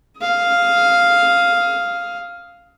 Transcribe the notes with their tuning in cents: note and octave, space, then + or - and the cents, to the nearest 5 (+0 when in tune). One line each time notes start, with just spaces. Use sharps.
F5 +0 D#6 +30